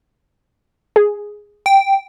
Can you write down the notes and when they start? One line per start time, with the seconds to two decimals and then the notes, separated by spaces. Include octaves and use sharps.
0.96 G#4
1.66 G5